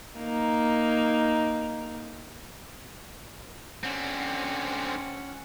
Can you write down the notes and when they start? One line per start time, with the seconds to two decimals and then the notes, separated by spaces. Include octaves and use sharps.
0.18 A#3 D#4
3.83 D3 C4 C#4 F#5